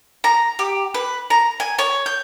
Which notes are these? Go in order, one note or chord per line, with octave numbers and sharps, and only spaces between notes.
A#5
G4
B4
A#5
G#5
C#5
G6